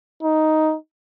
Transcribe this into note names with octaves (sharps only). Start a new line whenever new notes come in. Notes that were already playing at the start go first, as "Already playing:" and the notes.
D#4